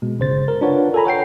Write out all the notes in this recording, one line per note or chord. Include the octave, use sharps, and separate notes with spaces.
B2 G#3
G1 C#3 C5 A6
A#4
D4 F4 B4 C#5 F#5
A4 A#4 G#5 A#5 B5
C#5 F#5 G5 C7